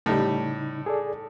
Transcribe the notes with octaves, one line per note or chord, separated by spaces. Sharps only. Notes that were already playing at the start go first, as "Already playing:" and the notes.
A2 C#3 G3 D#4
G#4 A4 D5